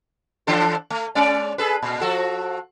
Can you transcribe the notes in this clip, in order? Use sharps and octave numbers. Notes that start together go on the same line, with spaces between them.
E3 D4 A4
A3
G#3 C#4 D5
G#4 A4 B4
A#2
F3 F#4 A4